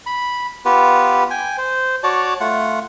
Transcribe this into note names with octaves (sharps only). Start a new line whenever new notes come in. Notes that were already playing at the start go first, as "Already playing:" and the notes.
B5
B3 F4 G4 B4
G5 G#5
C5
F#4 C#5 D5 A5
A3 F4 F#5